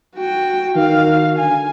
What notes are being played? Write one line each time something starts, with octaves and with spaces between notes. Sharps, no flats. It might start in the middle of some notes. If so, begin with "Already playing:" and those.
F#4 G5
D#3 F#4 F5
D3 G#5